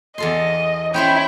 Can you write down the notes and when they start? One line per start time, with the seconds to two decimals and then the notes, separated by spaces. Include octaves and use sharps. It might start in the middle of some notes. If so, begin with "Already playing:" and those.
0.18 E2 A4 D#5 C6
0.94 C#4 E4 C5 G5 C6